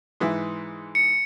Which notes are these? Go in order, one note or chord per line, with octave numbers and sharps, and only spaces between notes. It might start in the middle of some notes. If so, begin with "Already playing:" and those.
G#2 E3 E5
C#7